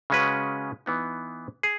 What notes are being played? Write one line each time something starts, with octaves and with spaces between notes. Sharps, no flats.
C#3 G#3 C#4 F#4 B4
E3 B3 D#4
G#4